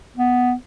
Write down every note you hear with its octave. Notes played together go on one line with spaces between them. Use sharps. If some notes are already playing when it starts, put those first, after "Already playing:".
B3